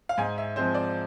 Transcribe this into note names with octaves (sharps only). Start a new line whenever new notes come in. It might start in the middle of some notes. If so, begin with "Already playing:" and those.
F5
G#2 G#5
E5
F3 G#3 C4 C5
D5